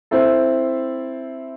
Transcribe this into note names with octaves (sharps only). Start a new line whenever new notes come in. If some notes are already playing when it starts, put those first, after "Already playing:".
C4 E4 A4 C5 E5